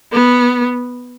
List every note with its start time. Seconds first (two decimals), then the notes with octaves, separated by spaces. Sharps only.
0.12 B3